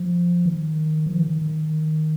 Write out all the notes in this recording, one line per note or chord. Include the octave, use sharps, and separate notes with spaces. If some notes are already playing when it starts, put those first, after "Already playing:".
Already playing: F3
D#3
F3
D#3
D#3
D#3